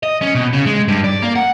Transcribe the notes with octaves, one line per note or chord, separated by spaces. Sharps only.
D#5
C#4
B2
C#3
G#3
G2
D5
A#3
F#5